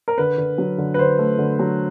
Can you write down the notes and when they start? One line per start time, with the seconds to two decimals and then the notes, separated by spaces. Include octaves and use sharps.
0.08 A#4
0.18 D3 B4
0.38 D3
0.58 F#3
0.78 D3
0.94 B4
0.98 D3 C5
1.18 A3
1.38 D3
1.59 F#3